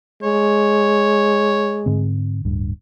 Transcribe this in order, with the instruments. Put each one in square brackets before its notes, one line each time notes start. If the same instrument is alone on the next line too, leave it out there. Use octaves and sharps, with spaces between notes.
[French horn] G#3 [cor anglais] C#5
[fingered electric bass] G#2 D3 C4
D1 G2